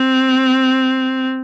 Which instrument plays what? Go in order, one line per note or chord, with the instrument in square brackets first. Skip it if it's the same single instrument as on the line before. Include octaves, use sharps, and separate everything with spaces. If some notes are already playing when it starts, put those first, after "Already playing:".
Already playing: [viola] C4